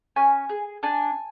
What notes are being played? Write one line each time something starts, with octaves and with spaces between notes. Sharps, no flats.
C#4 G#5
G#4
D4 G#5